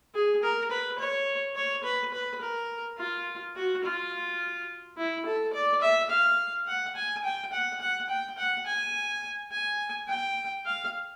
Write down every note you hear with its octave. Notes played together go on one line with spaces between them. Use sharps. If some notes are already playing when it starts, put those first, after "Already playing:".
G#4
A#4
B4
C#5
C#5
B4
B4
A#4
F4
F#4
F4
E4
A4
D5
E5
F5
F#5
G#5
G5
F#5
F#5
G5
F#5
G#5
G#5
G5
F5